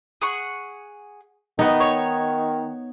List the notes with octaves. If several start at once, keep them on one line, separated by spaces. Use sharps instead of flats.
G#4 F#5 C#6
D#3 B3 D#4
C#5